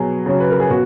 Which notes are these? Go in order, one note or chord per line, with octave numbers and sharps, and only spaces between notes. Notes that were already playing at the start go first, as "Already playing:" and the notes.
Already playing: B2 F#3 G#4
C#3 F#3
B4
A#4
G#4
B2 F#4